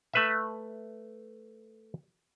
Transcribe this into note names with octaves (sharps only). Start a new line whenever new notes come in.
A3 B4 E5